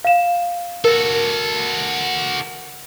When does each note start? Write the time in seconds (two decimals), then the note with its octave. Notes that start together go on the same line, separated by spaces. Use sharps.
0.04 F5 E7
0.85 F#4 A4 A#4